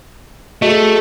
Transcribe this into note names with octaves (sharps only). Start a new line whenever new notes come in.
A3 F#4 G#4 D#5